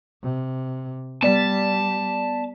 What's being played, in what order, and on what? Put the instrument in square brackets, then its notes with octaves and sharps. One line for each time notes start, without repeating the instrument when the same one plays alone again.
[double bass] C3
[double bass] G3 [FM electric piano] B3 D5 B6 [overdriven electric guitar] A5